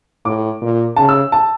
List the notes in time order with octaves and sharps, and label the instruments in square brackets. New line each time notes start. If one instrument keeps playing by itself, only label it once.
[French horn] A2 [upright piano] D6
[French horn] A#2
[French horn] C#3 [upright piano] A5
[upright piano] E6
A5